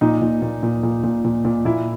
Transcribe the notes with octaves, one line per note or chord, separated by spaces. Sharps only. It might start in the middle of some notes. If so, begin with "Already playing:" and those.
A#2 D#4
A#2
A#2
A#2
A#2
A#2
A#2
A#2
A#2 E4